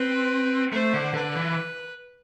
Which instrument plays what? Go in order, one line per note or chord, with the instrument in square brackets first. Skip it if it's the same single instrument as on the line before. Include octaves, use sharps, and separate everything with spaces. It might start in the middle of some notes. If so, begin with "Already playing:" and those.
Already playing: [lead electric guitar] C4 [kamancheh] B4
[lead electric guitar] A3 [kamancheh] C5
[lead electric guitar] D3
[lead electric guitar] D3 [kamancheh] B4
[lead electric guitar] E3